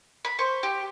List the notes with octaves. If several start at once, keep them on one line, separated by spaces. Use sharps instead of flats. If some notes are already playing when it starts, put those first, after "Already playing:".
B5
C5 C#6
G4